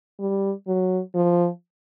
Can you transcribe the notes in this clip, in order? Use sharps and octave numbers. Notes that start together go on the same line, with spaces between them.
G3
F#3
F3